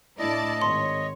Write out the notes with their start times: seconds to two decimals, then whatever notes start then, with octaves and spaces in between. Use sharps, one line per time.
0.19 A2 D4 E4 D5 D#5 A5
0.62 G#1 C#5 C6